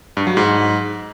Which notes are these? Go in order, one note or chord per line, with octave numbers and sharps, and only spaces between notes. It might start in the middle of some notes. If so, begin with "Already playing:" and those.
G2
F#3
G#2